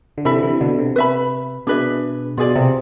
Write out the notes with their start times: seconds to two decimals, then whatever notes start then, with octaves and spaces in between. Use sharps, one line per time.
0.18 D3
0.25 C3 E3 A4 E5 B5
0.36 D3
0.43 C3 E3
0.61 B2 D3
0.79 C3
0.96 B4 E5 B5
1.67 B2 D4 G#4 B4 E5
2.37 B2 F4 G#4 D5 F5
2.56 C3